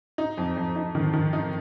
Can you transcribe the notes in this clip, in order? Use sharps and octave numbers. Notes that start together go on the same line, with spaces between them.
D#4
F2
F2
D#4
D#3
D#3
D#4